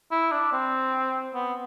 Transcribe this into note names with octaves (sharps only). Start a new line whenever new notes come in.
E4
D4
C4
B3